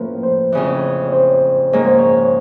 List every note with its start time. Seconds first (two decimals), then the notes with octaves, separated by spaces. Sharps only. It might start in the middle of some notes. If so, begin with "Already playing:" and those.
Already playing: A2 F3 A#3 C#4 B4
0.23 C5
0.52 F2 C#3 E3
1.08 C#5
1.12 C5
1.73 G#2 F3 A#3 C#5
1.86 C5
1.99 C#5